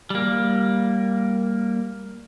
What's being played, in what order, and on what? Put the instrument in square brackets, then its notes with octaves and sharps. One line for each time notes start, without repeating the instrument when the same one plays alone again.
[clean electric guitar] G3 A#3